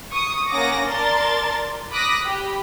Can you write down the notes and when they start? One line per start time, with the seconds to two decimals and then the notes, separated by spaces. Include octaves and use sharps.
0.13 C#6 D#6
0.50 A#3 C#4 F#5 G#5 D6 A#6
0.87 A#4 D5 A5 C6 A6
1.91 B5 D6 D#6 F#6 A#6 B6
2.22 G4 B5